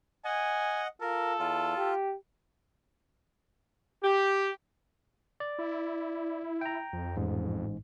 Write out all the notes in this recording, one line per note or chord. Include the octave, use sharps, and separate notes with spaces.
D#5 F#5 G#5
F4 A4 A#4
E2 F4
G4
G4
D5
E4
G5 A#5
F2
A1 G#2